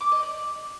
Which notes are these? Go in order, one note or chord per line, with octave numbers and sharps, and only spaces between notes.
D6
D#5
D5